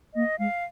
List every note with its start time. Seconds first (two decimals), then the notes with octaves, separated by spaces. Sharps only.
0.14 A#3 D#5
0.39 G#3 F5